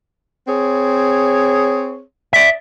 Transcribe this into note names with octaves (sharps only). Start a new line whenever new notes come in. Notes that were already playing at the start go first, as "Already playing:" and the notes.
C4 G#4 C#5
D5 E5